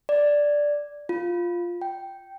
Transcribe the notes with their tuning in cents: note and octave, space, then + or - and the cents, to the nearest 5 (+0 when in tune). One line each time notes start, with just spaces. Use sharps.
D5 +0
F4 +0
G5 -5